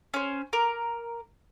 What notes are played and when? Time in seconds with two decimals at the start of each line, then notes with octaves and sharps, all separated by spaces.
0.14 C#4 C5
0.53 A#4 D6